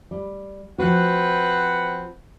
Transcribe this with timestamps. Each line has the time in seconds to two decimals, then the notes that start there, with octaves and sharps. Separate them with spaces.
0.11 G3
0.78 F3 C4 F#4 B4 F#5